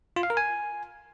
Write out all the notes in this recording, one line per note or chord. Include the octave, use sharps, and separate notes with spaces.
F4
F5
A#4
G#5